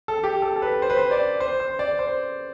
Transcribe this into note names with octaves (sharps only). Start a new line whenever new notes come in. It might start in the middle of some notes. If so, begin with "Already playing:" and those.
A4
G4
A4
A4
B4
C5
B4
C5
D5
C5
C5
D5
C5